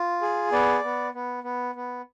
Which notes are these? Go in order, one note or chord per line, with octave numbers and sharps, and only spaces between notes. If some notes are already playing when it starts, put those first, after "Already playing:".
Already playing: F4
G#4
B3 D5
B3
B3
B3
B3